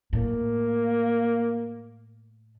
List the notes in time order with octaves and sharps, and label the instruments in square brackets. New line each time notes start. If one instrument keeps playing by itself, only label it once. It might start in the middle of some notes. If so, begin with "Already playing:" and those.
[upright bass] A2 [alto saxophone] A#3